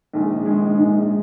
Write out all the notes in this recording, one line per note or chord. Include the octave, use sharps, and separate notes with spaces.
A#1 G#2 D#3 G#3
A#1 G#2 D#3 G#3
A#1 G#2 D#3 G#3